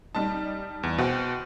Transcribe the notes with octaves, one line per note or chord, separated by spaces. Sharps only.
G3 D#4 A5
E2
B2 C5 F#5 G5